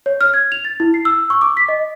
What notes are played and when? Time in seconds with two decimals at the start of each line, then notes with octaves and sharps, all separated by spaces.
0.06 C#5
0.21 F6
0.34 G#6
0.52 F7
0.65 A6
0.80 E4
0.94 C7
1.05 E6
1.30 C#6
1.41 D6
1.57 B6
1.69 D#5